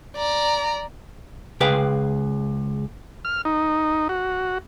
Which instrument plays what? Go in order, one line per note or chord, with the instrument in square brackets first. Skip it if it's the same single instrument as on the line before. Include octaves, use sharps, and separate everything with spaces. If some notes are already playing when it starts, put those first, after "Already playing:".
[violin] D5 A#5
[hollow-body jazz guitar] C#2 G#4 B4 F5 G5
[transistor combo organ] F6
D#4
F#4